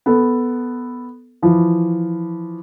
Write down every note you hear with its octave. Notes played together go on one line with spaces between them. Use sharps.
B3 A4
E3 F3